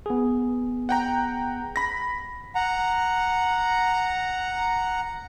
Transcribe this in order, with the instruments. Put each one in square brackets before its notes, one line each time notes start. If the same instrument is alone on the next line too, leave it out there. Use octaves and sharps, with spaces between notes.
[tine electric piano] B3 G#4
[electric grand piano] F#5 G5 A#5
B5 A#6
[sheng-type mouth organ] F#5 A#5